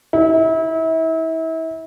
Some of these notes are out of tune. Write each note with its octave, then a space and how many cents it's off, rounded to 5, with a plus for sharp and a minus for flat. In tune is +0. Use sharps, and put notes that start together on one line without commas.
E4 -35